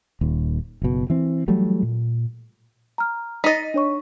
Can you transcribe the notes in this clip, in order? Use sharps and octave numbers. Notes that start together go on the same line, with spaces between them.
D#1 D#2
F#1 B2
E3 C4
E3 F#3 G3 A3
A#2
A#5 F6
D#4 D#5 A6 B6
D4 C#5 C#6